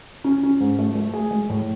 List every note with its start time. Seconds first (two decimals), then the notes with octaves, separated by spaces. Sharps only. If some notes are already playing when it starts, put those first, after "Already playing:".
0.24 C#4
0.43 C#4
0.60 G#2
0.79 A3
0.95 A3
1.14 G#4
1.31 G#3
1.50 A2